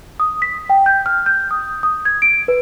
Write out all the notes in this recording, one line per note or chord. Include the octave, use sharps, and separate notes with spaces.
D#6
B6
G5
G6
F6
G6
D#6
D#6
G#6
D7
B4